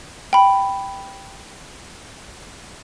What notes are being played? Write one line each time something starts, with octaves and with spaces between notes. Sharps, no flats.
G5 B5